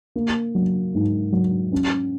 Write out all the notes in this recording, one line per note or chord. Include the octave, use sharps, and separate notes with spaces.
A#3
F#3
G#2
F#3
C#4